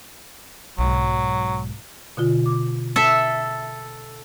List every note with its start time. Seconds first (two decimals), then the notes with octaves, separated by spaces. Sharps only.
0.78 B1 G#2 F#3
2.17 B2 D3 F4
2.46 D6
2.96 A4 E5